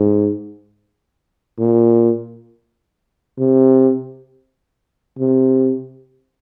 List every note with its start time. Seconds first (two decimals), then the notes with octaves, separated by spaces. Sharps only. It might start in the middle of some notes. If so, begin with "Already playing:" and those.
Already playing: G#2
1.59 A#2
3.39 C3
5.19 C3